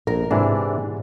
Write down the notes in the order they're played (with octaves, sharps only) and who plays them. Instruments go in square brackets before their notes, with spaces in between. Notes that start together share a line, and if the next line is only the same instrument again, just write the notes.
[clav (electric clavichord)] A#1 [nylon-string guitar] A#4
[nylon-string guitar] G#2 [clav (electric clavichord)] C3 E3 D4